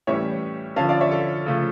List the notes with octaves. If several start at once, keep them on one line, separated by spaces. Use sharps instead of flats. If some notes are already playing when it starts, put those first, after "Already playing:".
A2 E3 G3 C#4 C#5 E5
D3 F3 C#4 F5 A5
D5 F5
C#5 E5
A4
C#3 F3 A3